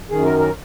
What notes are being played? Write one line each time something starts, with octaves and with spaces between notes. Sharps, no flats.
F#2 D#3 G#4
A#4
A#4